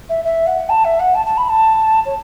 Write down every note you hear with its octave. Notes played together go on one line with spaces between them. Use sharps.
E5
E5
F#5
A5
E5
F#5
A5
A5
B5
A5
C#5